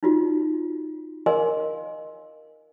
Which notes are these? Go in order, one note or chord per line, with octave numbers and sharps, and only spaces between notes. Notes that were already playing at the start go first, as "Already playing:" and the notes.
D#4 F4 F#4
G#4 A#4 D#5 F5 G#5 C6